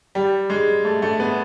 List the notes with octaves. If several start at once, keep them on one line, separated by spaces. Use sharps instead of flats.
G3
G#3
A3
A3
B3